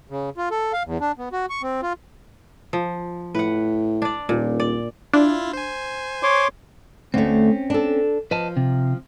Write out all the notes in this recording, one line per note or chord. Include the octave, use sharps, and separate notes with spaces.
C#3
F4
A4
F5
E2
D4
B3
F#4
C#6
C4
F4
F3
A2 B4 F#5
D4 D5
D#1 A#2
D5
D4 E4 F4
C5 G#5
C#5 C6 D6
D2 A3 C4 C#4
D4 A4
F3 B4 D#5 A5
C3